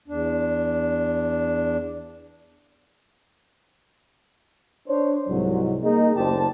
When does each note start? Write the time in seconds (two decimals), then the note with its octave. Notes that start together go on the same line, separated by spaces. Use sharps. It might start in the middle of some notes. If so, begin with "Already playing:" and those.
0.08 E2 D4
4.88 D4 C5 C#5
5.28 C2 G#2 F#3
5.82 A#3 D#4 G#4
6.16 F#1 D2 D3 G4 C5 A5